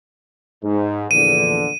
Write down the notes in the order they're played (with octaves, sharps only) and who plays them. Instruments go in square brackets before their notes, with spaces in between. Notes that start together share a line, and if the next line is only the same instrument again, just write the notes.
[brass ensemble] G#2
[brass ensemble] A#1 E2 D3 [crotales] D#7